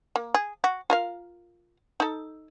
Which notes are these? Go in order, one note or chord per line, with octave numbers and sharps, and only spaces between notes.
A#3
G#4
F#4
F4 A#4 F5
D#4 A4